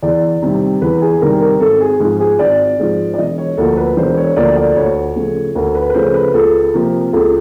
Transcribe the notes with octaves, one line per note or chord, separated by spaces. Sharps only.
E2 D5
C3 D#3 G3
E2 B4
G#4
C3 D#3 G3 A#4
A#4
G#1 A4
G#4
G#2 F3 G#4
G#4
G#1 D5
G#2 F3
D5
E1 D#5
C#5
D2 D3 F3 A#3 A4
B4
E1 C5
C#5
D2 D3 F3 A#3 D5
D5
D2 C#5
C#3 F3 A3
D2 A#4
B4
B4
C#3 F3 A3 C5
B4
C#2 A4
C3 F3 A#3
C#2 A4